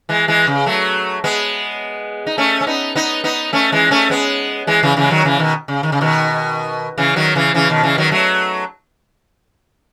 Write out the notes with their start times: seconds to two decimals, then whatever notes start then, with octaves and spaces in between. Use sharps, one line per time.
0.09 E3 G#3
0.28 E3 G#3
0.47 C#3
0.66 F#3 A3
1.24 G#3 B3
2.27 D#4
2.38 A3 C#4
2.61 C#4
2.67 B3 D#4
2.95 B3 D#4
3.24 B3 D#4
3.53 A3 C#4
3.72 E3 G#3
3.91 A3 C#4
4.10 G#3 B3
4.67 E3 G#3
4.83 C#3 E3
4.97 C#3 E3
5.03 G#3
5.11 D#3 F#3
5.25 C#3 E3
5.39 B2 D#3
5.68 C#3
5.83 D#3
5.92 C#3
6.01 B2 D#3
6.98 C#3 E3
7.16 D#3 F#3
7.35 C#3 E3
7.54 C#3 E3
7.70 B2 D#3
7.83 C#3 E3
7.98 D#3 F#3
8.12 F#3 A3